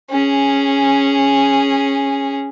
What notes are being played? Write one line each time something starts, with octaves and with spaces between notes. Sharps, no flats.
C#4 G#4